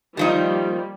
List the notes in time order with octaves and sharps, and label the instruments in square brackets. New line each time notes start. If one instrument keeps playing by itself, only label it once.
[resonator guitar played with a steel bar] D#3 F3 D#4 [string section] G3 A#3